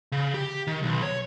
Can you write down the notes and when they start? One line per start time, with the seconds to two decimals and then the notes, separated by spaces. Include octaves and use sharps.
0.12 C#3
0.34 G4
0.67 D#3
0.83 B1
1.03 C#5